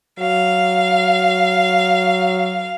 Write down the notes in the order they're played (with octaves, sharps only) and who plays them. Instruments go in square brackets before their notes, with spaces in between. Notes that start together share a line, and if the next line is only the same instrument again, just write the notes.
[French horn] F#3 [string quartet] F5